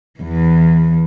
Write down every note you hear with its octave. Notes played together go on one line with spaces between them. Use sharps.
E2 E3